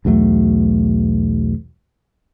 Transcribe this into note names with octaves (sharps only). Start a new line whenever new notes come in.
B1 E2 F#3 A3